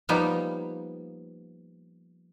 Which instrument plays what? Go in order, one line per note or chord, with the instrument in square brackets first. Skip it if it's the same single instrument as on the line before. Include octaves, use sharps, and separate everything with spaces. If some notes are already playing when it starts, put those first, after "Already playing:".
[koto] F3 G3 A#3 B3 D#4